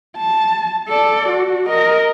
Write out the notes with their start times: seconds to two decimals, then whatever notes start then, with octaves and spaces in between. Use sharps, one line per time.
0.18 A5
0.89 A4 D5
1.29 F#4
1.68 A#4 D#5